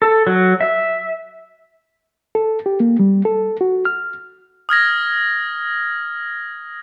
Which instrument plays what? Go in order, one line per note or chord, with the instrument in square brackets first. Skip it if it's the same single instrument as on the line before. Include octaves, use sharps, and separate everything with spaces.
[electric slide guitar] A4
F#3
E5
[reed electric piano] A4
G4
A#3
G3
A4
F#4
F6
[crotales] D#6 F6 G#6 A#6